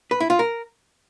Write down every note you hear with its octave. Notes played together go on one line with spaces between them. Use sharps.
B4
E4
F4
A#4